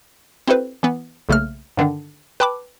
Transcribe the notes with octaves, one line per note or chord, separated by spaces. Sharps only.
C4 E4 F#4 A4 B4 C5
E3 B3
B1 C#3 A3 A#3 F6
G2 D3 D#3 D4
B4 G5 A5 B5 D6